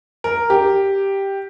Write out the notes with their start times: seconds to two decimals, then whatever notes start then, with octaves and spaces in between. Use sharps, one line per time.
0.24 A#4
0.50 G4